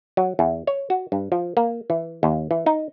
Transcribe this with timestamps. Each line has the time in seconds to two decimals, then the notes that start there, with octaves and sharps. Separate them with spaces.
0.17 F#3
0.39 E2
0.67 C#5
0.90 F#4
1.12 G2
1.32 F3
1.57 A#3
1.90 E3
2.23 D#2
2.51 E3
2.66 D#4